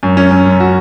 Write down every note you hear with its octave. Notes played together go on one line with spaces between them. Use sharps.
F#2
C#4
F#2
F#2
F#4